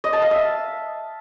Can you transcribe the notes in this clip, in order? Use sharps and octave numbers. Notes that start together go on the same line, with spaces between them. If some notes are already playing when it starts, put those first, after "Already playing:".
D#5
A5
F5
E5